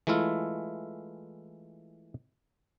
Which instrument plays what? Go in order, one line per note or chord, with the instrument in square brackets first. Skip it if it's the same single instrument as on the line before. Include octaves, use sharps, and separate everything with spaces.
[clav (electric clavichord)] E3 G#3 A3 E4 F4